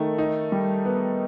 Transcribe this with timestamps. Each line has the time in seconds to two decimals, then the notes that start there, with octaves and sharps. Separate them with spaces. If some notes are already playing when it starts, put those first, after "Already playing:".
Already playing: D#3 A3
0.18 D#4
0.52 G3
0.85 B3